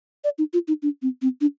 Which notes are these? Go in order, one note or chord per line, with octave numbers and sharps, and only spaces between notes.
D5
D#4
F4
D#4
D4
C4
C4
D4